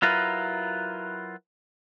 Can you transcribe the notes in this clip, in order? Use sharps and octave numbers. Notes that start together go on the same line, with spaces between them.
F#3 E4 F4 A#4 B4